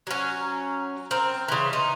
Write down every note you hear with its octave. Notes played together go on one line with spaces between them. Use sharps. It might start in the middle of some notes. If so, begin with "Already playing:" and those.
F#3 C#4
A#5
C4 A#4 A#5
C#3 E3 C6
D#4